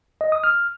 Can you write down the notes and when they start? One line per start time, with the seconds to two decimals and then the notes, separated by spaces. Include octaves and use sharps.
0.21 D#5
0.32 D#6
0.44 F6